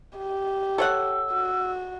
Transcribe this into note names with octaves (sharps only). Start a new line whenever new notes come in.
G4
A4 C#5 F#5 E6
F#4